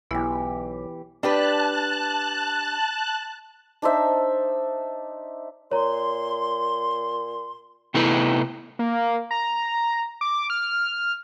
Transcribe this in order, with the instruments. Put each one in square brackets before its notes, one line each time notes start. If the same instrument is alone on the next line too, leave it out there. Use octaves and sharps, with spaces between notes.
[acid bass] B1 [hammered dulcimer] E3 G4 [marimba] B3 E4
[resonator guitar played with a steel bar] D4 G4 B4 [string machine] A5 F#6
[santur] D4 D#4 C5 E5
[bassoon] A#2 [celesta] C#5 A#5 [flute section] C6
[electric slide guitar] C3 A3 B3 D#4 E4 B4
[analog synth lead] A#3
A#5
D6
F6